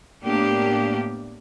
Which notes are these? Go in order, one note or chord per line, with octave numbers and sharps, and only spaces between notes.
A2 A#3 B3 D4 G4